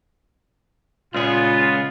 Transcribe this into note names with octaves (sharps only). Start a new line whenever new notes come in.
C#2 A#2 B3 F4 G#4